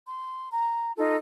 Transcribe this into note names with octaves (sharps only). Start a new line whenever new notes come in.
C6
A#5
D#4 F4 A4